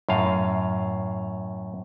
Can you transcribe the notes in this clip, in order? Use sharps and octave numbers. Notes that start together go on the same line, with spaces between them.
F#2 A2 F5